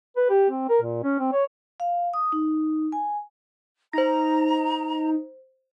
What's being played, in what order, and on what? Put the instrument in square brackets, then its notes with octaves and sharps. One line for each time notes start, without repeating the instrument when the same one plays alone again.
[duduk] B4
G4
C4
A#4
A#2
C#4
C4
C#5
[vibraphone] F5
D#6
D#4
G#5
[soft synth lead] D#4 [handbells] C5 A#6 [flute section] A#5